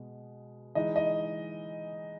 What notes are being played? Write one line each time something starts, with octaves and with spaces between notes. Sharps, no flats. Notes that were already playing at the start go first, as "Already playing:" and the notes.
Already playing: B2 G#3
E3 G#3 D#4 D#5
D#5